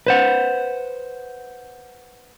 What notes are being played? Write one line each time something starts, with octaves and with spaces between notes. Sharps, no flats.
B4 C5 F#5